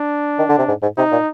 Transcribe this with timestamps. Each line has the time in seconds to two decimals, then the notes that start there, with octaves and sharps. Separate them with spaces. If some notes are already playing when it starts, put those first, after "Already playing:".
Already playing: D4
0.38 D#3
0.48 D3
0.58 C3
0.68 G#2
0.82 G#2
0.97 C3 D#4
1.12 A#2